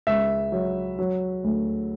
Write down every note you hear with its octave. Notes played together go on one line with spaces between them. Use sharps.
C#2 E5
F#3
F#3
D2